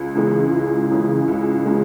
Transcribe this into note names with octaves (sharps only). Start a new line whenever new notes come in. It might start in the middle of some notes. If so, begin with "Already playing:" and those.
Already playing: C#2
C#3 E3 G#3
C#2
C#3 E3 G#3
C#2
C#3 E3 G#3